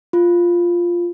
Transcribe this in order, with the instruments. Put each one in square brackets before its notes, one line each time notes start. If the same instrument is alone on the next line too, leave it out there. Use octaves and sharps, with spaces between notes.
[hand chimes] F4